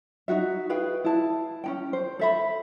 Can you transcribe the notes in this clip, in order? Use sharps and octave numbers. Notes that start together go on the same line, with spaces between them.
D#4 F4 F#4 E5
G#4 B4 F5 G5
E4 A5
C#4 D#4 G5
C5
A4 E5 B5